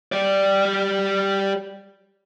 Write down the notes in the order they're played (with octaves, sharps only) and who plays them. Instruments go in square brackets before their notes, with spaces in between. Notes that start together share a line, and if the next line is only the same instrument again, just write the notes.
[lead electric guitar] G3 D5